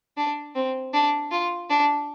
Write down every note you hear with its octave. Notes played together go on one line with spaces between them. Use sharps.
D4
C4
D4
F4
D4